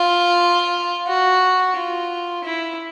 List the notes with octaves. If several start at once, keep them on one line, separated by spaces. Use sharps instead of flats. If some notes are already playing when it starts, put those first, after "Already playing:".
Already playing: F4
F#4
F4
E4